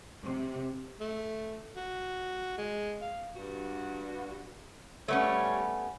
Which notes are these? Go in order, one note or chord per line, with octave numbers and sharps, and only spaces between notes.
C3
A3
F#4
G#3
F5
G2 F#4
G3 A3 B3 C#4 C#5